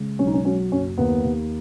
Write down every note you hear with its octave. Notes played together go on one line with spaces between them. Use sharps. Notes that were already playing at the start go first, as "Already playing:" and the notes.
Already playing: C#3 G#3
B1 C#4
D#4
C#4
F#3 C#4
F#1 C#4
D#2 B3
D#2